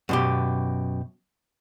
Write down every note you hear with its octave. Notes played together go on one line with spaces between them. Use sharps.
F#2 B2 G4